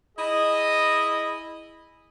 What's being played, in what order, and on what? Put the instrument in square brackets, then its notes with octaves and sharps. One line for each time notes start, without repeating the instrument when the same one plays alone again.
[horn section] E4 G#4 D#5